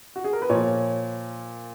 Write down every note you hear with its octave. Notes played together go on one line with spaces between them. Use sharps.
F#4
G#4
A#4
B4
A#2 F3 C#5